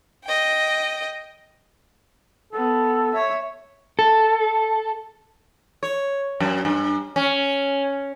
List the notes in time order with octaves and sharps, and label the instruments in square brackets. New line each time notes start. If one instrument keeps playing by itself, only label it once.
[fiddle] D#5 G5
[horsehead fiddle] B3 [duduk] A4
[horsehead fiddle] C#5 E5
[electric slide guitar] A4
[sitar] C#5
F#2
G2
C#4